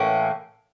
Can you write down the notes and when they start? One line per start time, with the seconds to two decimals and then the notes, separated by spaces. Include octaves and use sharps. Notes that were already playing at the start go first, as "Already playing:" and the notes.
Already playing: A2 E3 A#3 C#4